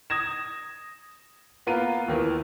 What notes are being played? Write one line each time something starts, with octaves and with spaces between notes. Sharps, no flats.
D#6 G#6 A#6 E7
A#3 B3 F4 A#5 D#7
D#2 D#3 E3